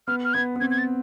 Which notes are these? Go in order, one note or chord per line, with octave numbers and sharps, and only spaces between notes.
B3 F6
F6
B3 G#6
B3
C4 G#6
G#6
A6